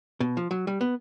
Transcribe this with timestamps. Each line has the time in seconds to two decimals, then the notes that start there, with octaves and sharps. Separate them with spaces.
0.20 B2
0.37 F3
0.51 F#3
0.67 G3
0.81 B3